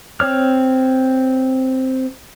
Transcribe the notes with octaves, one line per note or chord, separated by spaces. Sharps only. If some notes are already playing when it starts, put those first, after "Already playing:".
C4 C#5 F6